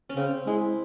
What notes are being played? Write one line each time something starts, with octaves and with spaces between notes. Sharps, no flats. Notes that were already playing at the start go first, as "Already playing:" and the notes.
C#4
C#3 C4
G#3 E4